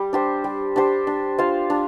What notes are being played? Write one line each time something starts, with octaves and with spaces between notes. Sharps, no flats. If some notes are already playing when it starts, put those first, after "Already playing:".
Already playing: G3
D4 G4 C5
G3
D4 G4 C5
D4
F4 C5 F5
D4